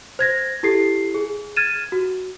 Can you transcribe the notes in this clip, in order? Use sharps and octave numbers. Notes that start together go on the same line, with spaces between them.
C5 G#6 A#6
E4 G4 A4 C7
G#4
F6 G#6 A6 D#7 E7
F#4